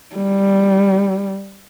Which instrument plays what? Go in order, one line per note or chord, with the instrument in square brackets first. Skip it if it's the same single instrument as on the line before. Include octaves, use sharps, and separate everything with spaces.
[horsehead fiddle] G3